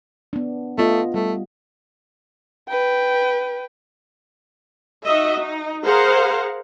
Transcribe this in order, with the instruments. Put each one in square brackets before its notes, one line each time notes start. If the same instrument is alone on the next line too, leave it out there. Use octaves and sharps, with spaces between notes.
[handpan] B3 D4
[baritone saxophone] A3 [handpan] B3 F4 D#5
[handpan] G3 [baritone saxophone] A3
[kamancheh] B4 G5
[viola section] D#4 F#4 D#5 E5
D#4
G#4 A#4 C5 F5 F#5 A#5